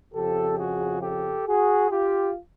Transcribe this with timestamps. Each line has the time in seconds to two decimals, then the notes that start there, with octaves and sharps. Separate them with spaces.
0.13 F2 C#3 F3 G4 A4
0.58 F#4 G#4
1.02 G4 A4
1.46 F#4 G#4
1.91 F4 G4